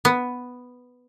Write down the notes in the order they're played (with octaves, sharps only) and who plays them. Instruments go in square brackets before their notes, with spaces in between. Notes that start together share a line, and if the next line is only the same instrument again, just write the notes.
[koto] B3